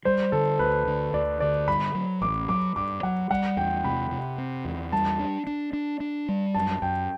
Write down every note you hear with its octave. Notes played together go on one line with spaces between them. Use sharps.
G3 C5
D3 A4
D2 B4
D3
D2 D5
D3 D5
G2 B5
F#3
A1 D6
F#3 D6
G2 D6
F#3 F#5
G3 F#5
E2 G5
C3 B5
C3
C4
E2
G3 A5
D4
D4
D4
D4
G3
F#2 A5
F#2 G5